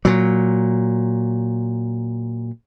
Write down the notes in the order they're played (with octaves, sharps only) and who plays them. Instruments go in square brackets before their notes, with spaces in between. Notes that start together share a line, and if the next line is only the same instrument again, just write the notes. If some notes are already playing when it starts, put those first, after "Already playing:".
[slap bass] A#2 F#3